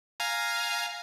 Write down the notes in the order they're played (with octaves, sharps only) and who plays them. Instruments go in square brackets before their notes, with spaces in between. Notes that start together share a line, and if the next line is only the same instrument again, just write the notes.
[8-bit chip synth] F5 G#5 A#5